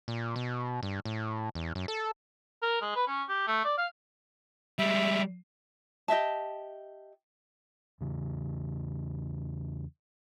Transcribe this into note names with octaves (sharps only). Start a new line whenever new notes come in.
A#2
B2
G2
A2
E2
F#2
A4
A#4
G#3
B4
C#4
G4
A3
D5
F5
G3 G#3 E5
G4 D#5 E5 A5
E2 C#3